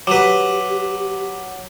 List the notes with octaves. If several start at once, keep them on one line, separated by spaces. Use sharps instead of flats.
F#3 G4 B4 D6